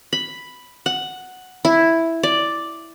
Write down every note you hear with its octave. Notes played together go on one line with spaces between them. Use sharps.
B5
F#5
E4
D5